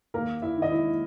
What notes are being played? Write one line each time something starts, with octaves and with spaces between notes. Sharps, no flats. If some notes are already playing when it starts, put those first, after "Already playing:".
D#2 A#3 A#4
E4 E5
D#3
D#5
E4 E5